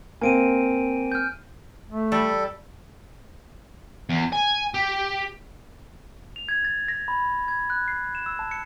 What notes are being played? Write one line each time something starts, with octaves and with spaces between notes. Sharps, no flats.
A#3 C4 G#5 D7 D#7
F6 G6
A3
G3 A4
E2
G#5
G4
F7
G#6
A6
A#6
B5
G#6
F#6
C7
E7
E6
A5
C#7